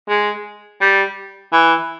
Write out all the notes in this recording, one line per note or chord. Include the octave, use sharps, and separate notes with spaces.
G#3
G3
E3